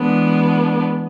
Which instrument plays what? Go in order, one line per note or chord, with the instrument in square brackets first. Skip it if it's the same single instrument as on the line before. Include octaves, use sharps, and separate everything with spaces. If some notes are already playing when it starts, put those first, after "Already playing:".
Already playing: [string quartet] E3 G#3 B3 D4